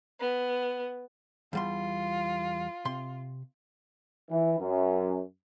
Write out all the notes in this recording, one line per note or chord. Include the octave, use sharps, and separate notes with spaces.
B3
E2 G3 F4 C6
C3 C6
E3
F#2